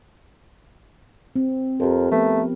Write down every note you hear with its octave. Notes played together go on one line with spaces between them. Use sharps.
C4
F2 G4 A#4
F3 A3 B3 B4